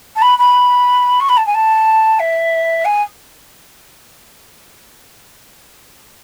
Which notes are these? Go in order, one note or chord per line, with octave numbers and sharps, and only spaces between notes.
A5
B5
B5
C#6
B5
A5
G#5
A5
E5
G#5